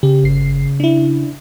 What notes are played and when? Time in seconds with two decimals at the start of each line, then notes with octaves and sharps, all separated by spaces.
0.03 C#3 G4
0.23 G1 C7
0.80 D4 E4